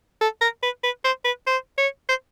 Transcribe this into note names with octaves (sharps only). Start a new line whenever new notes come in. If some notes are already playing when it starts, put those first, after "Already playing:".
A4
A#4
B4
B4
C5
B4
C5
C#5
C5